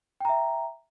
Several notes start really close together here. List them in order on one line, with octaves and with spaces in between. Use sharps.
G5 A#5 E5